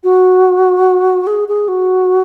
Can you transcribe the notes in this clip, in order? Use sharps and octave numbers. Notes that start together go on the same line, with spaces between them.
F#4
G#4
G#4
F#4